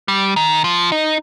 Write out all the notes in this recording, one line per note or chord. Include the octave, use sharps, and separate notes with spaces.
G3
D#3
F3
D#4